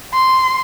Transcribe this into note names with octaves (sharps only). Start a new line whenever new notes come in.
C6